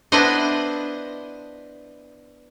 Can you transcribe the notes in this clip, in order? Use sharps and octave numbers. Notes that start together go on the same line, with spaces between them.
B3 D4 E4 B4 C5 D#5